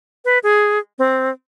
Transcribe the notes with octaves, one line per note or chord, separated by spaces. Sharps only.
B4
G#4
C4